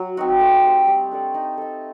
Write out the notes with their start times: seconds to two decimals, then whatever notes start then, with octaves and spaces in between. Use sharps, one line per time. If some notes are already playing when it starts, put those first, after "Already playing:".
Already playing: F#3
0.17 C4 D#4 F#4
0.40 A3
0.63 C4 G4 C5
0.87 G3
1.11 D4 A4 D5
1.34 D#4
1.58 A4 D#5